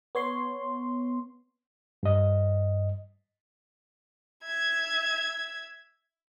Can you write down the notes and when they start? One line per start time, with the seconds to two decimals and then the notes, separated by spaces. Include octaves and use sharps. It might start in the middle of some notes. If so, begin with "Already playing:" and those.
0.15 B3 C#5 C6
2.03 G2 D#5
4.43 E5 G#6